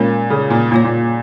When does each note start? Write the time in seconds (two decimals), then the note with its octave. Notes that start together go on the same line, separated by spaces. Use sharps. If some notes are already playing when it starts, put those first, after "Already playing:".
Already playing: A#2 G#3 C#4 A#4 C#5
0.30 C#3
0.50 A#2
0.71 A#2 A#3 F4 C#5
0.84 A#2